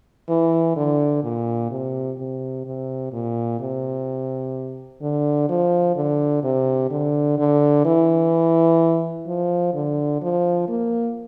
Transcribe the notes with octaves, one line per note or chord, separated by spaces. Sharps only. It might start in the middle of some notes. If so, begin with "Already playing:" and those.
E3
D3
A#2
C3
C3
C3
A#2
C3
D3
F3
D3
C3
D3
D3
E3
F3
D3
F3
A#3